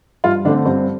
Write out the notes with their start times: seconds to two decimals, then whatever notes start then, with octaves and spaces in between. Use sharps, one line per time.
0.24 G2 F4
0.45 D3 A3 C4 D4
0.65 G2 C4